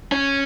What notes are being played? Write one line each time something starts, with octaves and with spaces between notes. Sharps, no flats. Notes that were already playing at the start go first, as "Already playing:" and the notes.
C#4